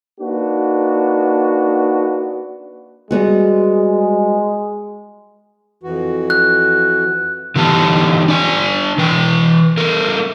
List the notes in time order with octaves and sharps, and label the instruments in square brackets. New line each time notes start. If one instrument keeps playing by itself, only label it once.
[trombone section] A#3 D4 D#4 F#4 B4
[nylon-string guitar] G3 B3 F#4 [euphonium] G#3
[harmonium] F2 E3 F#4
[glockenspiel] F#6
[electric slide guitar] D3 E3 B3 G4 A5
D4 D5 G#5
E3 B4 G5
A3 A#4